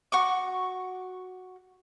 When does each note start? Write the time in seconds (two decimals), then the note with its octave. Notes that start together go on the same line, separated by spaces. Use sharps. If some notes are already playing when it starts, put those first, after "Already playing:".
0.12 F#4 C#6 D6